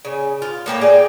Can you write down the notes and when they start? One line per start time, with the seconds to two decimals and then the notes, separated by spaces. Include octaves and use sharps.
0.05 C#3
0.42 F4
0.66 A2 A#3 G5 A#5
0.81 G#4 D5 G5